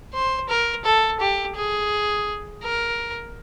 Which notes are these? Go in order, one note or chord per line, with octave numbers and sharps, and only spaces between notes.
C5
A#4
A4
G4
G#4
A#4